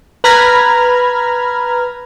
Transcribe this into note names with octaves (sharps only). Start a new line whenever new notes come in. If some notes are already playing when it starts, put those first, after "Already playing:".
B4 A#5 B5 F6 G#6